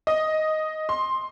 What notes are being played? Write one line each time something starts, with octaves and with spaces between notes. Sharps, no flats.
D#5
C6